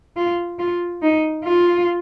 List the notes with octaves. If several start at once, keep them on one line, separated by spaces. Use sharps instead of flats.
F4
F4
D#4
F4